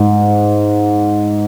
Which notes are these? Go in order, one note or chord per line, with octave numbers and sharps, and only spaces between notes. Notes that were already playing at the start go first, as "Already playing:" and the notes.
Already playing: G#2